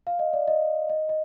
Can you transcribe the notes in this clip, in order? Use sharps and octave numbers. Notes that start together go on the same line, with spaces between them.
F5
D#5
D5
D#5
D#5
D#5